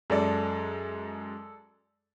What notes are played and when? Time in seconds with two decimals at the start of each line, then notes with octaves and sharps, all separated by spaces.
0.10 F#2 G#3 A4 D5